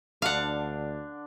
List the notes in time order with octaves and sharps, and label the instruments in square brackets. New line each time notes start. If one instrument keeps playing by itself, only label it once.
[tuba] D2 [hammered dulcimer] D3 D4 [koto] F5 F#5